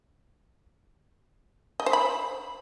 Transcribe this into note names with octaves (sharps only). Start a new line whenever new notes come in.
D#5
C5
B5